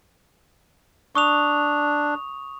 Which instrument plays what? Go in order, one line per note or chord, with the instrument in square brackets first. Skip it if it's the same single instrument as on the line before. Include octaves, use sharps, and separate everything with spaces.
[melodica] D4 [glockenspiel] C#6 D#6 F7